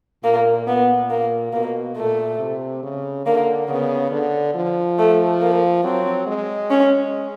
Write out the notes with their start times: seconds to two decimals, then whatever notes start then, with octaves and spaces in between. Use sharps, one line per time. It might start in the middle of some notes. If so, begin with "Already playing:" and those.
0.24 A#2 A#3
0.67 A#2 B3
1.10 A#3
1.53 B2 A#3
1.97 A#2 A3
2.39 C3
2.83 C#3
3.26 D3 A#3
3.68 C#3 B3
4.11 D3
4.55 F3
4.98 A3
5.41 A#3
5.84 F#3 C4
6.27 G#3
6.70 C#4